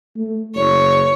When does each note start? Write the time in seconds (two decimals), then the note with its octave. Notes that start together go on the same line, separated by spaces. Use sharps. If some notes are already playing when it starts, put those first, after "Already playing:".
0.17 A3
0.55 F#1 C#5